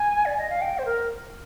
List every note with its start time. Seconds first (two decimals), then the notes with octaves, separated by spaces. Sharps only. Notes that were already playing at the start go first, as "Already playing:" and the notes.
Already playing: G#5
0.25 D5
0.37 D#5
0.49 F5
0.61 G5
0.78 C5
0.85 A#4